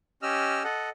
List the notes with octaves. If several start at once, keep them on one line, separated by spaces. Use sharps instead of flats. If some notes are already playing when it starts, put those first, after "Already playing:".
C#4 G4 D#5 E6 F6
A4 D#5 F#5